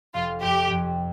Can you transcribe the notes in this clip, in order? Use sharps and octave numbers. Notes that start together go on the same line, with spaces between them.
F1 F4
F2 G4
F2